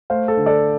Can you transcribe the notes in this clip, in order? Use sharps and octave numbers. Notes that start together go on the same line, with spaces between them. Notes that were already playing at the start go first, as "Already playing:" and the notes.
A3 C5 F5
A4
D3
A4 D5